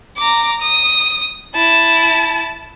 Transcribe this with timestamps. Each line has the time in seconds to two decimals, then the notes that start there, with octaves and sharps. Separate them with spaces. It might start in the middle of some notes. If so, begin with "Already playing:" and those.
0.18 A#5 D6
0.62 D#6
1.55 E4 A5